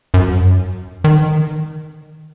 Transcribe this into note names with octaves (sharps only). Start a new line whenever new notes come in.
F#2
D#3